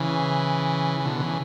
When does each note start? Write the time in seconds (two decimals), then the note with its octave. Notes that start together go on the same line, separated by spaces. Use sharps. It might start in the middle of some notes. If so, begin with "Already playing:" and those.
Already playing: C#3 E3
1.00 E3
1.05 B2 D3
1.21 C#3 E3